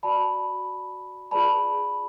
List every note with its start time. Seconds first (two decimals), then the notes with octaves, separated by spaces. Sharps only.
0.03 F#4 B4 D5 A5 B5
1.31 F4 G#4 B4 D5 A5 B5